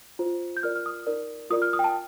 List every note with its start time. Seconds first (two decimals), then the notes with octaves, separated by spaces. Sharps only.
0.19 F4 C5
0.57 G6
0.63 F4 A#4 D5 F6
0.76 F6
0.86 D#6
1.07 D#4 A#4 D5
1.50 F4 A#4 D5 D#6
1.62 F6
1.73 D#6
1.79 G5
1.84 A5